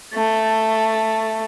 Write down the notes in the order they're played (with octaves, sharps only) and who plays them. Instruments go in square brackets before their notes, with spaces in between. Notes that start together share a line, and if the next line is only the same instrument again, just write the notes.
[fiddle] A3